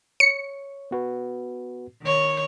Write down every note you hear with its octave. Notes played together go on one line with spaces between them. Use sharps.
C#5 C#7
B3 F#4 B4
D#3 C#5